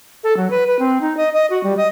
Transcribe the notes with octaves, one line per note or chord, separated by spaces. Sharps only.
A4
F#3
B4
B4
C4
D#4
D#5
D#5
F#4
G3
D#5